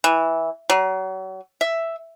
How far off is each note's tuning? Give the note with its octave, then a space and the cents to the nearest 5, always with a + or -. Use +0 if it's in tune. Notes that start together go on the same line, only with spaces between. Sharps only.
E3 -10
F#3 +35
E5 +5